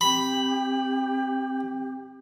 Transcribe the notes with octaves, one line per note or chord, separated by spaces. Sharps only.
C4 G4 B5